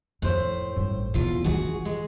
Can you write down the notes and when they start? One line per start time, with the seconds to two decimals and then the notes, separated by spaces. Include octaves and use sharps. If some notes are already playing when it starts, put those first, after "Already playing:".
0.22 F2 A2 C5
0.76 A1 G2
1.14 E2 B2 F4
1.44 E3 F4 F#4 G#4
1.85 G#3